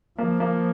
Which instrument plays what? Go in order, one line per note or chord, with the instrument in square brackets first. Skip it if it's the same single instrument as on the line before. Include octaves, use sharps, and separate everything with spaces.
[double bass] F3 [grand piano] A#3
[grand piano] A#3